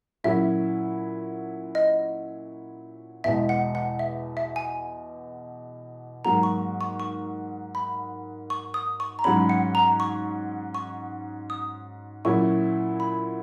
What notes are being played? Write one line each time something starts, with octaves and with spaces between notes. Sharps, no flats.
A#2 F#3 C#4 E4 E5
D#5
E2 B2 G#3 E5
F#5
F#5
E5
E5
G#5
G#2 F#3 A#3 A#5
C#6
C#6
C#6
B5
C#6
D#6
C#6
A#5
G#2 F#3 C#4 B5
F#5
A#5
C#6
C#6
D#6
A#2 F#3 C#4 E4 C#6
B5